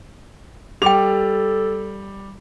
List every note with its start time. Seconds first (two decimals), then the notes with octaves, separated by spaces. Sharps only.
0.82 G3 G4 A4 G5 D6 F7